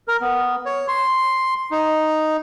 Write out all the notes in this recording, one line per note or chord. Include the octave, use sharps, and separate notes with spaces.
A#4
B3
C#5
C6
D#4